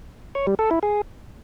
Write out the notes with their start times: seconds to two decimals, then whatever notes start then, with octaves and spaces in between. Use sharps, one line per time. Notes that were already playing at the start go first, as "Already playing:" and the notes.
0.35 C#5
0.47 G3
0.59 A4
0.71 E4
0.83 G#4